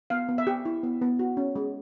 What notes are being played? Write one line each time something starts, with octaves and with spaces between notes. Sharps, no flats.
B3 F5
B3
E5
G4
E4
B3
B3
F#4
C#4
G#3